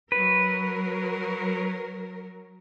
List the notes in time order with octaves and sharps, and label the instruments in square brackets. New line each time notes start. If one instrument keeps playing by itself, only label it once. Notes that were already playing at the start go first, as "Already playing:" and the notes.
[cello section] F#3 A#4 [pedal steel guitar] B4